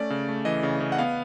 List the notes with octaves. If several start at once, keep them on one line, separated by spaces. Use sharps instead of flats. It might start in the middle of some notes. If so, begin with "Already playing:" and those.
Already playing: A3 C#4 D5
C#3
A3
E3 D#5
C#3
C#3
F#5
B3 F5